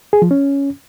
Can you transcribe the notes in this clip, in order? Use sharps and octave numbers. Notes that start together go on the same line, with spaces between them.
G#4
F3
C#4